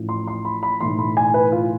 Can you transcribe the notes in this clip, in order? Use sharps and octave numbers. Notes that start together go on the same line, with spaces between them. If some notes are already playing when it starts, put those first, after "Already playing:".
Already playing: A1 A2 F3
C6
C6
B5
B5
B1 A2 E3 C6
B5
G#5
B4
F4